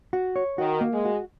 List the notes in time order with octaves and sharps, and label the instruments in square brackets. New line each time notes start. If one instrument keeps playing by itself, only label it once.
[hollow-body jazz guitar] F#4
C#5
[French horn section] D#3 [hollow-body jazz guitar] F#4
[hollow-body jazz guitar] A#3
[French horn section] G#3
[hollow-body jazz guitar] F#4